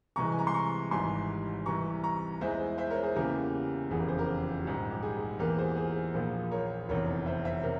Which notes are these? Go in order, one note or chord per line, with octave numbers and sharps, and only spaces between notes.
C2 C3 E3 G#3 A#5 C#6
G#5
A#5
C6
A#5 C#6
G#1 G#2 E3 G3 G#5 C6
C2 C3 E3 G3 A#5 C#6
A#5 C#6
E2 E3 G#3 C5 E5
C5 E5
A#4 C#5
G#4 C5
E2 C#3 E3 G3 A#3 G4 A#4
F1 E2 C#3 F3 G#4
G4 A#4
G#4 C5
G4 A#4
A#1 G#2 G3
G4
G#4
E2 E3 A#3 G4 A#4
G#4 C5
G#4 C5
A#1 A#2 F3 A#3
A#4 C#5
F1 E2 C3 A#4 C#5
C5 E5
C5 E5
C3 A#4 C#5